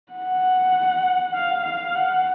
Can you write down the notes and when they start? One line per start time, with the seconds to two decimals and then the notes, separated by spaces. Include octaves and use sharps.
0.12 F#5
1.34 F5
1.63 F5
1.95 F#5